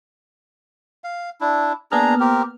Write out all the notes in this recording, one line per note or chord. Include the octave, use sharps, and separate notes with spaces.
F5
D4 E4
A#3 B3 D4 G#4 A#5 F6
C4 G4 A#4